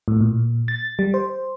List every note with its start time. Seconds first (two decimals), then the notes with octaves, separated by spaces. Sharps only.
0.08 A2
0.21 A#2
0.68 A6
0.99 G3
1.14 C5